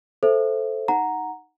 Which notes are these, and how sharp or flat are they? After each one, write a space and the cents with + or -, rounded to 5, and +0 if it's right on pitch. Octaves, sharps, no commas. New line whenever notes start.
A4 +0 C5 +0 E5 +10
D#4 +0 F#5 +0 A#5 +0